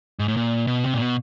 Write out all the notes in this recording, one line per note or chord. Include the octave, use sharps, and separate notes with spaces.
G#2
A2
A#2
B2
C3
A#2
B2